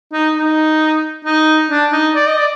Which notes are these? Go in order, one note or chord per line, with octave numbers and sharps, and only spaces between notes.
D#4
D#4
D#4
D4
D#4
D5
D#5
D5